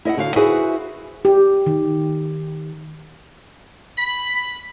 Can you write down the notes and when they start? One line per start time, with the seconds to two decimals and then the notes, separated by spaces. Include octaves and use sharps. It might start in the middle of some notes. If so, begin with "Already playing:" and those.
0.05 E4 D#5 E5 F#5
0.17 D3 F#4 F5
0.36 E4 F#4 G#4 B4 C5
1.25 G4
1.66 D#3
3.99 B5